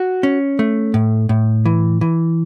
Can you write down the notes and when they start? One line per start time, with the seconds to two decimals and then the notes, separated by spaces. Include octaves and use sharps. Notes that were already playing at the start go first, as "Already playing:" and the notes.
Already playing: F#4
0.23 C#4
0.59 A3
0.94 A2
1.29 A2
1.65 E3
2.01 E3